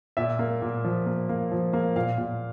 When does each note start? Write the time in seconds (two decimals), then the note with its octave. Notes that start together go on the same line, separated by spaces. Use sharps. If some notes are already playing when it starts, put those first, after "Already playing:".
0.17 A#2 E5
0.39 A#3
0.62 A#2
0.84 F3
1.06 A#3
1.29 A#3
1.51 F3
1.73 A#3
1.96 A#2 F5
2.18 A#2